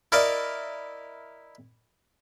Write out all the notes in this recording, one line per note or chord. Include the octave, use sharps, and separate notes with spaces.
E4 A#4 D5 D#5 F5